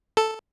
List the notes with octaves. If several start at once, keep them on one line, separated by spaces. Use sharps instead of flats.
A4